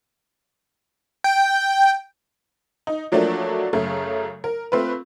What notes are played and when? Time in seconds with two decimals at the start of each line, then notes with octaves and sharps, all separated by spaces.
1.24 G5
2.87 D#4
3.12 F3 F#3 A3 A#3 D4
3.73 F#2 C#3 A3
4.44 A#4
4.72 A3 C4 F4 B4